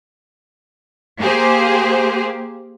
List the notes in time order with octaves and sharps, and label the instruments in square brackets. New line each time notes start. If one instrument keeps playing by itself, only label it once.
[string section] A#3 G4 G#4 C5